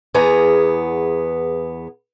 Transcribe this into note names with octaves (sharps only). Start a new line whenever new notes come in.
E2 B3 G#4 A#5